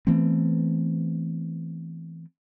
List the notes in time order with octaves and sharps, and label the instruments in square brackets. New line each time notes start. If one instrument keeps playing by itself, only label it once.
[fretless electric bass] E3 A3 B3 C4